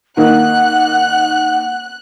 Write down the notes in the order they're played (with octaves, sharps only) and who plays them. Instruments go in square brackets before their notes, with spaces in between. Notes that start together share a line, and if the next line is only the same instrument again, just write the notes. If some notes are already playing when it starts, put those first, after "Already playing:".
[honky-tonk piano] D#3 A#3 D#4 [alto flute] F#5 [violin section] F#6